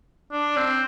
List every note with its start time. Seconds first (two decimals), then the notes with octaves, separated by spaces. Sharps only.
0.32 D4
0.56 C4